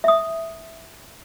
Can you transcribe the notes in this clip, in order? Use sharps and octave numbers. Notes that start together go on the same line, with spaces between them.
E5 D#6